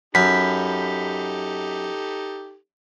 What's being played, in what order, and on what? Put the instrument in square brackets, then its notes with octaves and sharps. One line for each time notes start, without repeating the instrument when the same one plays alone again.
[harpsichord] F#2 [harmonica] D#4 G4 A4 [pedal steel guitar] B5